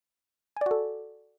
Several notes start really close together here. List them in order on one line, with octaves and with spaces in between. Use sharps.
G#5 D5 F#4 A4